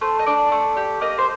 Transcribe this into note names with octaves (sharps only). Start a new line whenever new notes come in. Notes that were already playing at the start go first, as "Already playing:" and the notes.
A3 C5
D#5
D4 D5
A3
G4
A#3 D#5
C5